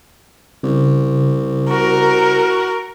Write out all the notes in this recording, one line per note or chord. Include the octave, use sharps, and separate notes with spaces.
C2 C#3
F#4 A#4